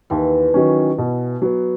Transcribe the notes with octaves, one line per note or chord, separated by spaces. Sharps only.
D#2 E3
D#3 F#3 C#4
B2
F#3 B3